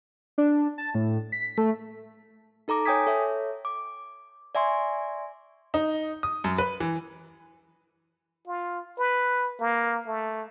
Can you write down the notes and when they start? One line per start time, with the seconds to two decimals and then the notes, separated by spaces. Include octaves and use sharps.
0.38 D4
0.78 A5
0.95 A2
1.32 B6
1.58 A3
2.68 D#4 A4 A#5 D6
2.86 C#5 G5 G#5 D#6 G#6 B6
3.06 A4 C#5 E5
3.65 D6
4.55 D5 E5 G#5 C6 C#6
5.74 D#4
6.23 D#6
6.44 F#2
6.58 B4
6.80 E3
8.47 F4
8.99 B4
9.60 A#3
10.07 A3